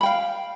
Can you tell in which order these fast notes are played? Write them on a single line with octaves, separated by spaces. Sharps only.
B5 G5 F5